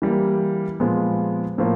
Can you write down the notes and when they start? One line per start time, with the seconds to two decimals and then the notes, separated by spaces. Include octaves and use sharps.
0.02 E3 G3 A#3
0.80 A#2 F3 G#3 B3
1.58 A2 F3 A#3